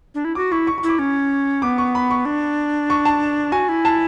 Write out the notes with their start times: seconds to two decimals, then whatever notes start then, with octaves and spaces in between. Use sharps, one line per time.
0.15 D4
0.25 E4
0.35 F#4 D6
0.52 E4 C#6
0.67 C#6
0.78 C#6
0.84 E4
0.89 D6
0.99 C#4
1.62 B3 D6
1.78 C#6
1.95 B5
2.10 C#6
2.25 D4
2.90 C#6
3.05 A5
3.52 F#4 G#5
3.69 E4
3.85 A5